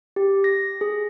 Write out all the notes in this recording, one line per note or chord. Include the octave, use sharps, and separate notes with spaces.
G4
A#6
G#4